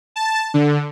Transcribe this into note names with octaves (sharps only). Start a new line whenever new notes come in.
A5
D3